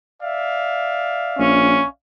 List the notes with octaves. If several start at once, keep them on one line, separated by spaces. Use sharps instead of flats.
D5 E5 F5
A#1 C#4